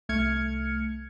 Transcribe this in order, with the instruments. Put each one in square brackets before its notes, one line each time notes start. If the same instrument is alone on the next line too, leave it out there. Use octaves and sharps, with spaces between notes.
[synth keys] C2 A3 F6 G#6 C#7